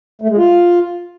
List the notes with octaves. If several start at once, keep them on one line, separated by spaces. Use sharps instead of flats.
A3
G#3
F4